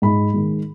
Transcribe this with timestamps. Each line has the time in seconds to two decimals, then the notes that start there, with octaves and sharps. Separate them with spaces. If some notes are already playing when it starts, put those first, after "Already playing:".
0.02 G#2 B5
0.34 D#3 G#3